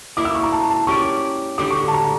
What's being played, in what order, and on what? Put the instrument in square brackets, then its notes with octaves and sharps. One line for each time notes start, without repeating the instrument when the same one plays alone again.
[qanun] A#3 E4 A#4 D5 [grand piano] D6
[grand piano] E6
C#6
A#5
A5
A5
[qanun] C#4 G4 A#4 D5 [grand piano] C#6
[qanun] D3 G3 D4 G4 [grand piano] D6
[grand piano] C#6
C#6
A5
A#5